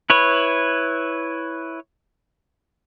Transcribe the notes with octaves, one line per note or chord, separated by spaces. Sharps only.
E4 B4 C#5